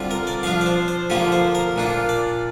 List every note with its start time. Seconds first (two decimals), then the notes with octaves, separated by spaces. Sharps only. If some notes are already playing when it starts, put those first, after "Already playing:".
Already playing: D3 G3 C4 F4
0.11 A#4
0.27 D5
0.43 F3 D4 F4 F5
0.61 D5
0.66 C5
0.88 C5
1.10 D3 F3 A#3 F4 G4
1.32 C5
1.55 A#4
1.76 A#2 A#3 D4 F4
2.09 D5